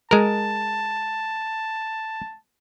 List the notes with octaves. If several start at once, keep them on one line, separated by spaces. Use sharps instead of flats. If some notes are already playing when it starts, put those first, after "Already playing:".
G#3 A#4 A5